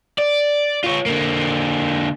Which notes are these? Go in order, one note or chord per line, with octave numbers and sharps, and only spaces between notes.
D5
F4 C#5
D3 A#3